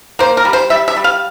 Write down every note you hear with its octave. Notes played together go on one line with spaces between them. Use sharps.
A#3 C5
A#4
G3
C5
G3 E5
E5
G3
F5